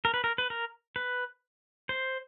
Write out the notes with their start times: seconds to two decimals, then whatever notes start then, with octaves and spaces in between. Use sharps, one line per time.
0.05 A#4
0.14 B4
0.24 A#4
0.38 B4
0.50 A#4
0.96 B4
1.89 C5